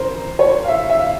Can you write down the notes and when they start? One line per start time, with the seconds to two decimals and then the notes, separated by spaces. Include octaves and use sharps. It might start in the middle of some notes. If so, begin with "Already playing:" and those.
Already playing: C#3 E3 A#4 C5
0.39 C#5
0.64 F5
0.68 E5
0.90 E5
1.00 F5